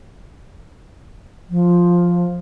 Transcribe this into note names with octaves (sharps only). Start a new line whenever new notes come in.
F3